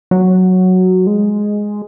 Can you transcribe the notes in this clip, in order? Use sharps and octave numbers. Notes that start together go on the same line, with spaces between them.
F#3
G#3